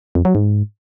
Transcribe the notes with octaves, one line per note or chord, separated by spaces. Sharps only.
F2
F#3
G#2